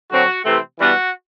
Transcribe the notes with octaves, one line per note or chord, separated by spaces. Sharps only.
D3 F#3 C4 F#4
C3 E3 A3 C4
E3 G3 B3 D4 F#4